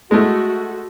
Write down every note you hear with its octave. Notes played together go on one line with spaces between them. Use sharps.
G#3 A3 F#4